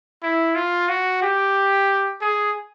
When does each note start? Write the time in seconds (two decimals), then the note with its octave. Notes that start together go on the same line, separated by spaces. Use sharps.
0.23 E4
0.55 F4
0.89 F#4
1.22 G4
2.21 G#4